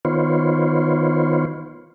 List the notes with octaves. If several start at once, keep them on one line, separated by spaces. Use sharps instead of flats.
D#3 B3 F4 C5 C#5